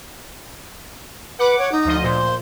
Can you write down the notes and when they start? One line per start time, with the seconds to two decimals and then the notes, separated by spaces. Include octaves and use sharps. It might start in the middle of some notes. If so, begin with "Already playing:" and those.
1.39 B4 F#5 D6
1.59 C#5
1.72 D#4
1.85 D2 F3 D#5
2.03 A#2 C5